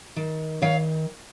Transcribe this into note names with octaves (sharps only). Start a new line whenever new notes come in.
D#3
D#3 C#5 F5